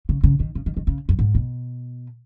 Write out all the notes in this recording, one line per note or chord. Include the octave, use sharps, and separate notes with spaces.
C#3
C#3
D#3
C#3
D#3
D#3
C#3
F#2
G#2
B2